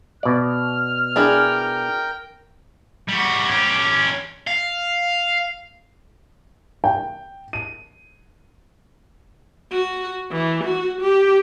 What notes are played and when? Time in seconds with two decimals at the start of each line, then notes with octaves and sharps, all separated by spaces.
0.23 B2 D5 F6
1.16 D4 E4 G#4 A#4 G5
3.09 G3 F#4
3.49 C#4 G4
4.47 F5
6.84 G5
7.53 D#7
9.72 F#4
10.31 E3
10.64 F#4
11.01 G4